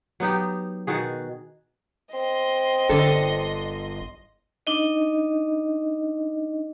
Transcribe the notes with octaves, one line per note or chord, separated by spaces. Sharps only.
F#3 B3 D#4 G4
B2 D#3 F#4 G#4
C4 D#5 C6
G1 D3 A4
D4 D#4 D#5